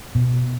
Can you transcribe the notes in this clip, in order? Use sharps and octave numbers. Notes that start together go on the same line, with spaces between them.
B2